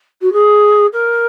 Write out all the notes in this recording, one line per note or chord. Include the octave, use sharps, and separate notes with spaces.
F#4
G#4
A#4